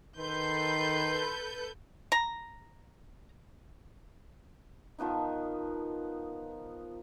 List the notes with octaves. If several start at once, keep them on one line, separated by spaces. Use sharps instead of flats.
D#3 A4 B4 C6 G6
A#5
D#3 F3 B3 D#4